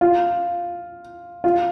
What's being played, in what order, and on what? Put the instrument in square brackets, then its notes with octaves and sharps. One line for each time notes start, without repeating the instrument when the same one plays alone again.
[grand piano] F4
F4